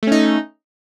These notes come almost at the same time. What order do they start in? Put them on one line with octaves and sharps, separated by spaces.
A3 C#4 D#4